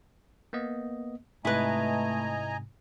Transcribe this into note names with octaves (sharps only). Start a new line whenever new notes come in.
A#3 B3 D#5
G#2 C3 A3 E4 B4 D#5 G#5 A#5